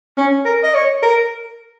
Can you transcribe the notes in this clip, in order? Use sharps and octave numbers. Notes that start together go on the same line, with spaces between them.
C#4
A#4
D#5
C#5
A#4